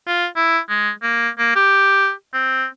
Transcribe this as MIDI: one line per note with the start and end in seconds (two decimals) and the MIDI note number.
0.08 0.26 65
0.36 0.59 64
0.69 0.90 56
1.02 1.29 58
1.38 1.53 58
1.56 2.11 67
2.34 2.66 60